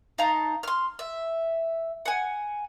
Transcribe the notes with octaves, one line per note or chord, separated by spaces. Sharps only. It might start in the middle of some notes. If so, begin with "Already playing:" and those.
D#4 F5 A5 A#5
C6 F6
E5
F#5 G#5